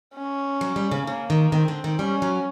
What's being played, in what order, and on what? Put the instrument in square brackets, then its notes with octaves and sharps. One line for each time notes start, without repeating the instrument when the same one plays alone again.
[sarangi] C#4
[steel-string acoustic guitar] F#3
G3
C#3
[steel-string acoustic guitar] C#3 [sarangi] A#3
[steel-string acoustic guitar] D#3
[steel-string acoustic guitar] D#3 [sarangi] C4
[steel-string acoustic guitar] D3
D#3
[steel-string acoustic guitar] G3 [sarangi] C#4
[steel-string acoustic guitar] F#3